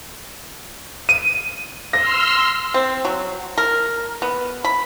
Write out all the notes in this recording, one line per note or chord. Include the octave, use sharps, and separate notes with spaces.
D#7
C6 E6 F6 A#6
C4
F#3
A#4
B3
B5